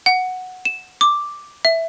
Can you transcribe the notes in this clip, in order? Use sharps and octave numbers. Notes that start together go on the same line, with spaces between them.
F#5
E7
D6
E5